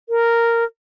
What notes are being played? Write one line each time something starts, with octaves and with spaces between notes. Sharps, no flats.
A#4